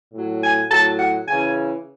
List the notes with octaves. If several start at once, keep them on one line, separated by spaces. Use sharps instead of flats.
A2
F#3
G#5
A2 F#3 A5
F#5
C#3 G#5
E3